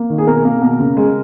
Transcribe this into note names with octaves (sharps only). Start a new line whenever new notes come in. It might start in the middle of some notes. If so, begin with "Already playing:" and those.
Already playing: A#3
D#3
G#4
B2 A#4
A#3
B2
C#3
G#3